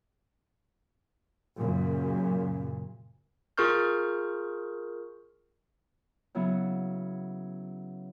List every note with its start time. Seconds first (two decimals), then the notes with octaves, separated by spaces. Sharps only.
1.57 F#2 A#2 C#3
3.57 F4 G#4 A#4 C#6 F6 G6
6.35 C#3 F#3 B3 E4 F#4